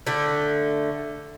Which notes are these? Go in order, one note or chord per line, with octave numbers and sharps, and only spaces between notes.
D3 A3